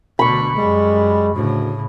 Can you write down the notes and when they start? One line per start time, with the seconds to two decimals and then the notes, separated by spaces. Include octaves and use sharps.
0.19 D2 B2 D3 B5 C#6
0.56 F#2 G3 G#3
1.35 D2 A2 C#3